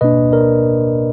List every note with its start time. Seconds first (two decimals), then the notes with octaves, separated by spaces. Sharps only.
0.01 B2 A#3 D4 B4 D#5
0.32 A#4 D5